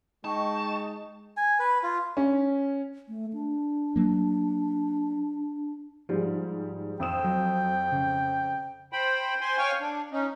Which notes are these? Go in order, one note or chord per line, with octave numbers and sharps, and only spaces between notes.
G#3 D#4 D#5 G5 A5 C#6
G#5
B4
F4
C#4
A3
D4
F#3 A#3
G#2 F3 G3 G#3
F2 G5 D#6 E7
F#3
C#3
C5 G5 B5
C5 G#5 C6
C#5 F5 G5 G#5 C#6
D4
C#4 D#4